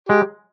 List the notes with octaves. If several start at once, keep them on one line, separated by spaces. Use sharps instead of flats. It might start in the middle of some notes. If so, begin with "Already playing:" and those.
G#3 G4